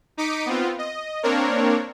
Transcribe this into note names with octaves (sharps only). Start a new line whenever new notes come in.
D#4 D6 B6 C#7 D#7
B3 C4 F4
D#5
A#3 C4 D4 A#4 C#5